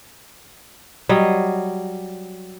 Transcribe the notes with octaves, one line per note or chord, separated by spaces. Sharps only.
F#3 G3 D#5